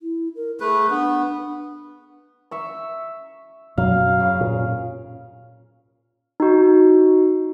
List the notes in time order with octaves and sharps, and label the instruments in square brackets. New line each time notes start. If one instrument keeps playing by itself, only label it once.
[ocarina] E4
A#4
[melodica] A3 B4 [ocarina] G#4
[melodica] B3 [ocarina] D4
[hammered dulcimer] E5 C#6
[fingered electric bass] F#2 B2 F#3 [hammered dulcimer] F5
[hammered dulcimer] C#3
[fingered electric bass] A#2
[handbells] D#4 F#4